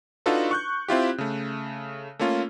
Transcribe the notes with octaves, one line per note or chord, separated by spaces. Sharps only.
D4 D#4 F4 F#4 A4 B4
C#6 F#6 G6
C4 E4 F4 G4
C#3 A3
A3 A#3 C#4 F4